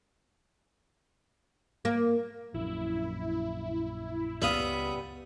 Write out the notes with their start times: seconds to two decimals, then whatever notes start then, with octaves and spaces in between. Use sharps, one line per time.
1.85 A#3
2.54 A#1 F#2 E4
4.42 C#2 G3 B3 E5 F5 B5 D#6